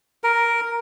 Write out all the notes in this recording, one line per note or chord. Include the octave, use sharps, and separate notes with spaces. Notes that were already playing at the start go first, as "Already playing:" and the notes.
A#4